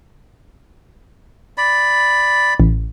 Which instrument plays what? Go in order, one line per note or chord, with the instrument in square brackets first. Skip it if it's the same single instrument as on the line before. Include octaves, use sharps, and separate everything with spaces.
[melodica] D5 B5
[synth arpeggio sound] A1